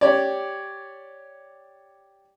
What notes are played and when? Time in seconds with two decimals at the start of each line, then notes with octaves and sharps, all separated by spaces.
0.01 G4 C#5 D5